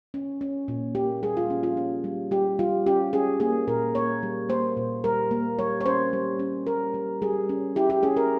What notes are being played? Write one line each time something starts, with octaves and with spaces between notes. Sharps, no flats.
C#4
C#4
A#2
A#3 G4
G3 G#4
F4
C#4
F4
C#4
G3
G3 G4
G3 F4
C#4 G4
C#4 G#4
A#3 G#4
A#2 A#4
A#3 C#5
G3
A#3 C5
A#2
G3 A#4
A#3
G3 C#5
C#5
C#4 C5
G3
C#4
G3 A#4
G3
G3 G#4
C#4
E4 G4
G4
C#4 G#4
A#4